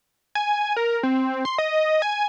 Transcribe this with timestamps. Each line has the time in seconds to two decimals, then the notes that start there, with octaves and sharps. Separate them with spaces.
0.35 G#5
0.76 A#4
1.03 C4
1.45 C6
1.58 D#5
2.02 G#5